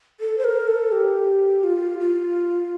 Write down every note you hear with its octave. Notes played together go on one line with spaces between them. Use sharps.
A4
C5
A#4
A4
G4
F4
F4